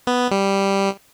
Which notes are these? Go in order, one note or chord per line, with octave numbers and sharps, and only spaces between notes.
B3
G3